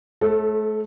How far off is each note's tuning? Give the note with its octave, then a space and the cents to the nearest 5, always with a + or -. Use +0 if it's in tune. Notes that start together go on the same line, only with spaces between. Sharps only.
A3 -35 A4 +0 C#5 -45